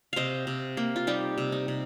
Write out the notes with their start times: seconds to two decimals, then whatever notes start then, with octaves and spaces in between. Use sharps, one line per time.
0.13 C3 C5 D#5 F5
0.47 C3
0.77 A#3
0.96 F4
1.07 G3 D#4 G4
1.38 C3
1.52 D#4
1.68 C3